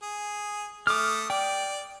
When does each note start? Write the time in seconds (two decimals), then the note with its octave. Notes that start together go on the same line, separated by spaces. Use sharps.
0.03 G#4
0.87 A3 D6 D#6 F6
1.30 D5 G5